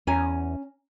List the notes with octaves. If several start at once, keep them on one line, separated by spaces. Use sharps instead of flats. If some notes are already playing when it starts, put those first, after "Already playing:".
E2 C#4 G#5 A#5